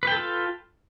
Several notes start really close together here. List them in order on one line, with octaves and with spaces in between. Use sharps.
B4 G5 A4 F4